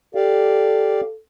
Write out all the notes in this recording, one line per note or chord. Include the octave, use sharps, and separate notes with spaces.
G4 A4 D5 F5